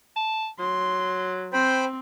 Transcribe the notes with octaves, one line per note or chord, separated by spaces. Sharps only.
A5
F#3 C6
C4 C5 G5 B5